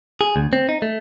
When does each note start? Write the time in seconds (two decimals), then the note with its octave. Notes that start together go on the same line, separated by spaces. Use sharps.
0.21 G#4
0.36 D2
0.53 C4
0.69 D#4
0.82 A3